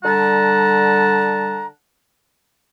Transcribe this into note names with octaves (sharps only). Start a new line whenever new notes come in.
D3 G3 F#5 A5 A#5